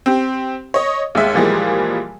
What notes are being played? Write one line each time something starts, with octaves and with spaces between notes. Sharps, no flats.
C4 G4
C#5 D#5
D#2 G#3 E5
A#2 E3 F3 G3 G#3 A#3